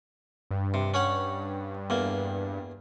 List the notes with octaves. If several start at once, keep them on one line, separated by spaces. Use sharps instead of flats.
G2
C3
C#4 C#5 F#5
E2 A#3